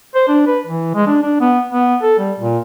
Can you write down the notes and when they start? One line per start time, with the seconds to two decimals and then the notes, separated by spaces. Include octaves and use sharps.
0.15 C5
0.28 D4
0.47 B4
0.66 E3
0.95 G#3
1.07 D4
1.23 D4
1.41 B3
1.70 B3
2.02 A4
2.18 G3
2.39 A#2